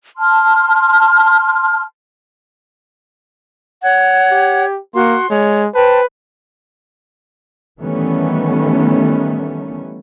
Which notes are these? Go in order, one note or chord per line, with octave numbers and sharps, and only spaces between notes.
A5 C6 F6
C#5 F#5 G#6
G4
A#3 F#4 C6
G#3 C#5
B4 C5 G5 A5
D#3 E3 G3 A3 B3 C#4